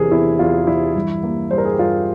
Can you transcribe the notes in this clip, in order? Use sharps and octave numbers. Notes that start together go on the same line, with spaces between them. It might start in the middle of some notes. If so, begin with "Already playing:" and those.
Already playing: E2 C3 E3 G#4 A#4
E2 E4
E2 F4
E3 E4
G2
A#3
G3 C5
A#4
G#4
G4
G2 F4